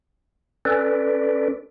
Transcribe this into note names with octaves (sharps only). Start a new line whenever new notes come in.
C#4 A4 B4 D5